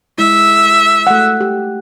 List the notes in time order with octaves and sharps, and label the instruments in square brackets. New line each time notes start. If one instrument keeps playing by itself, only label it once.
[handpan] G#3 E4 [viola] E5
[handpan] A3 F#5
G4